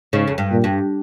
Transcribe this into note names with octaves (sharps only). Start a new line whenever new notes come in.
G#2 C#3
F2
G2
A#2
G2